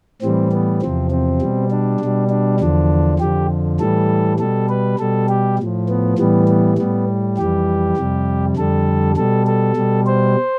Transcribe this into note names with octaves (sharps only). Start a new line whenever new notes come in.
A2 E3 G3 C4
B3
E2 C3 F3 C4
C4
B2 G3
D4
B2 G3
D4
E2 D3 F3 D4
F2 D3 F3 G4
A2 E3 G3 A4
B2 G3 A4
B4
B2 G3 A4
G4
A2 F3
B3
A2 E3 G3 B3
B3
A2 G3 B3
F2 E3 G3 G4
F2 C3 G3
F2 D3 G3 A4
B2 G3 A4
A4
B2 G3
C5